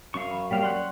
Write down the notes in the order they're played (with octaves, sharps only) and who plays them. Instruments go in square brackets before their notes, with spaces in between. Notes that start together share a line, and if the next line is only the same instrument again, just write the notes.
[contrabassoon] F#2 [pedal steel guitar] F5 C#6
[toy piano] B5
[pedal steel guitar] G3 A#3 F5 [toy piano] C#5 D5 G5
[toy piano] D5 C#6 [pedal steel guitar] F#5 C6